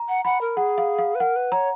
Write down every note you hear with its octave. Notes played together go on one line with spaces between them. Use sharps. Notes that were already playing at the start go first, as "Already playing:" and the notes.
Already playing: A#5
F#5
F#5 B5
A#4
G#4 F#5
F5
F5
B4
A#4 F#5
B4
C#5 A#5